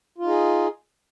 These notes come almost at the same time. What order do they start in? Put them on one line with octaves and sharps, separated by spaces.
F4 D#4 G#4